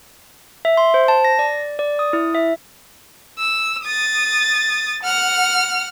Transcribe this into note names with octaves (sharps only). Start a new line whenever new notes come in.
E5
C6
C5
A5
A#6
D5
D5
D#6
E4
E5
E6
D#6 A6
F#5 F6